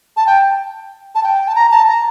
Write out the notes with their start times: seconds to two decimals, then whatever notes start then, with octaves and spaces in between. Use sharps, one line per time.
0.17 A5
0.27 G5
1.15 A5
1.24 G5
1.48 A5
1.55 A#5
1.72 A5
1.88 A#5